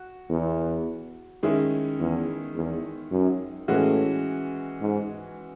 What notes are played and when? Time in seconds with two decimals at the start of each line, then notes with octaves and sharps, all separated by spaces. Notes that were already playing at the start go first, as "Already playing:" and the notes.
Already playing: F#4
0.30 E2
1.43 D#3 G#3 C#4 E4
2.00 E2
2.55 E2
3.11 F#2
3.68 A2 E3 G#3 C#4 F#4
4.81 G#2